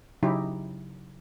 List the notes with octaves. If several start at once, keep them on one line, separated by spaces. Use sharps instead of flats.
C#3 F#3 D#4 E4 G4